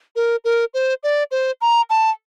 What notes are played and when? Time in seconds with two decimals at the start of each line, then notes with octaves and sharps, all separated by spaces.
0.16 A#4
0.45 A#4
0.74 C5
1.03 D5
1.31 C5
1.61 A#5
1.90 A5